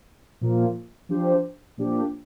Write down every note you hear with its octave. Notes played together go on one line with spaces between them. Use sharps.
A#2 F3 A#3 F4
F3 D4 G4 C5
A#2 F3 D4 G4